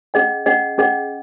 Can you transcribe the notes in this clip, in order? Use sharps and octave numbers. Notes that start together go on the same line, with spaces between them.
C#4 G#4 D#5 F#5
C#4 G#4 D#5 F#5
C#4 G#4 D#5 F#5